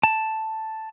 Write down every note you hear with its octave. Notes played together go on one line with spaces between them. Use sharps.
A5